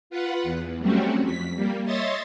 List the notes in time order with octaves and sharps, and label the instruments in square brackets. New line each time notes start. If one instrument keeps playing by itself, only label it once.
[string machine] F4 B4 F#5
E2
F#3 G3 A3 C4 C#4 F#4
F2 B6
G3 A#3
C#5 D#5 E5 C6 D#6 A6